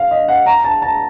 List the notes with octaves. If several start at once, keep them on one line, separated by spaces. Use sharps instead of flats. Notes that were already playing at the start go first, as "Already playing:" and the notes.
Already playing: F5
D#5
F#5
A#5
A5
A5